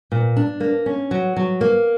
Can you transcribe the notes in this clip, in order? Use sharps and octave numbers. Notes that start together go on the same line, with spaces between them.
A#2
D4
A#3
C#4
F#3
F#3
A#3